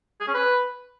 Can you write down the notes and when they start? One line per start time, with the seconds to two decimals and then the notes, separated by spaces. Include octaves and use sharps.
0.21 G#4
0.28 C#4
0.35 B4